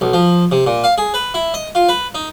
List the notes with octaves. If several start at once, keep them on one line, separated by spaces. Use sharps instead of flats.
B1
F3
C3
A#2
F5
G#4
B4
E4
D#5
F4
B4
D#4